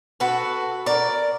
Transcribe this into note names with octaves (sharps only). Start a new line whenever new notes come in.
F#4 A4 B4
A#4 D5